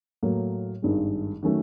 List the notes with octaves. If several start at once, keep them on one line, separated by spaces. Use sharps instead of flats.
A2 F#3 A#3
G#1 G2 D#3 G#3
D#3 F#3 A3 C#4